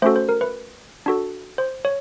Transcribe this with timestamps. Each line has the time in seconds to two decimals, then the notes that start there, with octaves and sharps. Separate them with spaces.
0.02 A3 C#4 F#4 A4 C5
0.16 C5
0.29 A#4
0.41 B4
1.06 D4 F#4 A4
1.58 C5
1.85 C#5